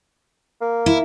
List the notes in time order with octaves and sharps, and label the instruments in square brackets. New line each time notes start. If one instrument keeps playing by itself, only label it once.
[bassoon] A#3
[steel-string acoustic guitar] E4